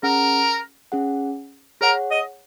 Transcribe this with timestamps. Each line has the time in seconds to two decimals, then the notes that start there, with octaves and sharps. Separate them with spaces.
0.03 C#4 G#4 A#4 F#5
0.92 C#4 G#4 F#5
1.81 G#4 A#4 C#5 F#5
2.11 D#5